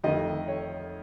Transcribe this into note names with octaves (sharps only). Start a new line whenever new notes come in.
F2 D#3 A3 D#5
C#5